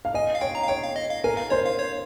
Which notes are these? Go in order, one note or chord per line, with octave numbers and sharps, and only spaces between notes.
F5
D#5 G#5
F5
C#5 G5
A#5
F5
C#5 G5
F5
D#5
F5
A#4 G#5
F5
C5 C#5
F5
C#5